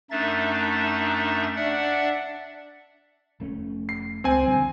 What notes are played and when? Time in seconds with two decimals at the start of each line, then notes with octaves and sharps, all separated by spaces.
0.11 F#2 A3 D4 D#4 E5 A6
1.56 D4 D5 E5 F#5
3.40 F1 A3 C#4
3.89 C7
4.24 C#2 C4 G#5
4.46 F2 D3 G3